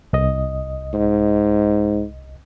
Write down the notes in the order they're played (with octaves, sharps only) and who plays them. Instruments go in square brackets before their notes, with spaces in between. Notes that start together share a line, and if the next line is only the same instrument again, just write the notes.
[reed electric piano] C2 D#5
[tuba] G#2